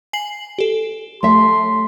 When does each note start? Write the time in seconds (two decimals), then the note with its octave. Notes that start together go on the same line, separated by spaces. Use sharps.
0.13 G#5 C7 F#7
0.58 G4 A4
1.23 A3 C#5 E5 C6